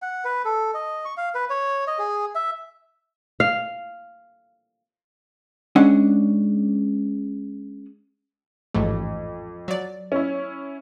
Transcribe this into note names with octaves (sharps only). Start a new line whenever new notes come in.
F#5
B4
A4
D#5
C#6
F5
B4
C#5
D#5
G#4
E5
F5
G#3 C#4 D4 F#5
A1 F2 G#2 A3
F#3 D5
C#4 E4